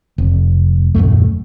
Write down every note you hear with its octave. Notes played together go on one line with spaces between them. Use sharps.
F1
D#1 G#1 F#2 A3